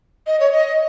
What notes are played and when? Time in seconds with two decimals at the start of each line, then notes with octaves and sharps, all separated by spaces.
0.27 D#5
0.40 C#5
0.52 D#5